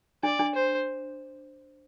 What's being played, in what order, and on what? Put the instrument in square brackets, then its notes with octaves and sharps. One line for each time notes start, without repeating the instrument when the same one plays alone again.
[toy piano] D4 [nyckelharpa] D5
[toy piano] D4
[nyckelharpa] C5